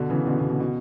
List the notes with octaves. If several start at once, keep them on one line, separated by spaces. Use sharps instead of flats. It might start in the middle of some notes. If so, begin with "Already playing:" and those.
Already playing: B2 D3
C#3 E3
B2 D3
B2
B2
B2